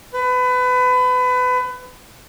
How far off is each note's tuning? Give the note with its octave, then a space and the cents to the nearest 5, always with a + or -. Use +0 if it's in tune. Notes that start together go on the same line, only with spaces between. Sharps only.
B4 +25